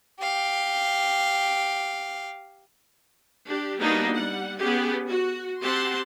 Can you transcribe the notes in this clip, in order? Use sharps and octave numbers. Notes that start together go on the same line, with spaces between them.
G4 F5
D4 G4
G3 A#3 B3 D4 D#4 F#4
G3 F#5
B3 C#4 G4 G#4
F#4
C4 G4 F#5 A5 C6